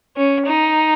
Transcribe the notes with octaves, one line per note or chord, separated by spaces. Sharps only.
C#4
D#4